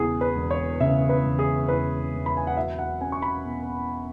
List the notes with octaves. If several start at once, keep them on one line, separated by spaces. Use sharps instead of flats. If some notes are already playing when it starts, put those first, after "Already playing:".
Already playing: E1 E2 C#3 G#4
B4
E1
C#5
C#3 E5
B4
E1
G#4
E2 B4
E1
B5
G#5
F#5
F#3 E5
F#5
C#4 G#5
C#6
B5
B2